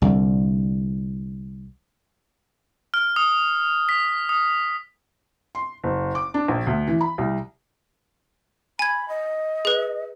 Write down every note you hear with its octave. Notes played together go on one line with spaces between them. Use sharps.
C2 D3
F6
D#6
B6
D#6
C6
F#1
D6
D4
A#1
D2
E3
B5
C2
G#5 B5 G#6
D#5
G#4 B4